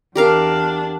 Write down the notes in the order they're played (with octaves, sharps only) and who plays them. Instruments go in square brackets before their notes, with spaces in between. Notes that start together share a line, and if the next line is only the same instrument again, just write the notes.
[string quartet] E2 D4 [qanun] G4 A#4 F5